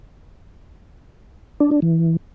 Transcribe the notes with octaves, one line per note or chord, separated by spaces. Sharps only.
D4
D4
E3